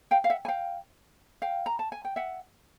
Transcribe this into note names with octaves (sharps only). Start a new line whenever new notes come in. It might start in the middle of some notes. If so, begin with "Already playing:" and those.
F5 G5
F5
E5 F#5
G#5
F5 G5
F5 G5
A#5
A5
G#5
G5
E5 F#5